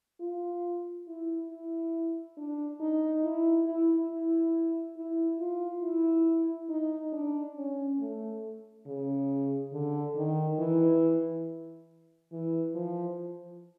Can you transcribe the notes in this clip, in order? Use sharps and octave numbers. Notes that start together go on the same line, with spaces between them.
F4
E4
E4
D4
D#4
E4
E4
E4
E4
F4
E4
D#4
D4
C#4
A3
C#3
D3
D#3
E3
E3
F3